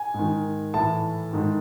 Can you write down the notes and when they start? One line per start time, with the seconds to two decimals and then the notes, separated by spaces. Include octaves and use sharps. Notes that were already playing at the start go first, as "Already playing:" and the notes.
Already playing: G#5
0.14 G#2 D#3
0.74 A2 E3 A5
1.33 G#2 D#3